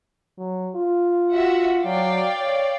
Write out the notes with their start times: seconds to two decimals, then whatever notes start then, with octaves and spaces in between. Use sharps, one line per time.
0.38 F#3
0.76 F4
1.31 F#4 E5 F#5
1.85 F#3 D5 F5 G5
2.39 C#5